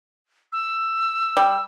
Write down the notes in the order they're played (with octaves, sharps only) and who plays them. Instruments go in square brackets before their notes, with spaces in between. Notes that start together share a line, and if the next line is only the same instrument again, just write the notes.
[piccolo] E6
[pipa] G3